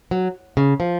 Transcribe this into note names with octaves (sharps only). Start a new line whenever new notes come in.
F#3
C#3
F3